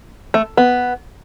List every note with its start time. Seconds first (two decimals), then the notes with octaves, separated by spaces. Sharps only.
0.34 A3
0.57 B3